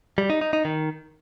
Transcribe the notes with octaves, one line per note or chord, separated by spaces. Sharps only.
G3
D#4
D#4
D#4
D#3